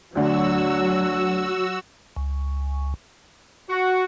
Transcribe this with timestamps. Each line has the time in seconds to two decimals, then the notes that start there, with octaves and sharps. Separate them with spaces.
0.15 D2 D3 F#3 F#4 E6
2.16 C#2
3.70 F#4